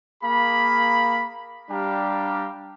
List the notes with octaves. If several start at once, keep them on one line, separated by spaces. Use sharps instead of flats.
A#3 G#4 F5 B5
G3 D4 G4 F5 A#5